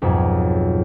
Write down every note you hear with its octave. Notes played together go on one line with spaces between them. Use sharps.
B1 F2 G#2 F#3